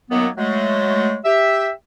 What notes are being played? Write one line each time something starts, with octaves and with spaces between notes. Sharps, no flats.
F#2 D#3 F#3 A#3 B3
F#3 G#3 A3
G4 E5